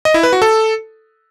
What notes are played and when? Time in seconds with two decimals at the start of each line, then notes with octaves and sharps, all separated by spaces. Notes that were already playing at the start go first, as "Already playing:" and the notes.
0.05 D#5
0.14 E4
0.23 B4
0.33 F#4
0.42 A4